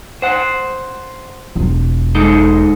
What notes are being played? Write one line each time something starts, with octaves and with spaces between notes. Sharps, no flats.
C5 F#5
E1 F4
G#3 D#4 A4